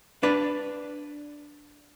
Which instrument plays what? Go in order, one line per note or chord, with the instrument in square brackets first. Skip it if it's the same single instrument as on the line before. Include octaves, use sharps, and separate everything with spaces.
[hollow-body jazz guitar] D4 B4 D5